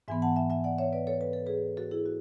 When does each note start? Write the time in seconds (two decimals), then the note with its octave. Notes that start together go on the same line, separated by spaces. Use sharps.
0.08 G#2 E3 B3 E5 G#5
0.22 F#5 A5
0.36 E5 G#5
0.50 E5 G#5
0.64 D5 F#5
0.78 C#5 E5
0.93 B4 D5
1.07 A4 C#5
1.21 B4
1.33 A4
1.46 G#4 B4
1.77 F#4 A4
1.91 E4 G#4
2.06 F#4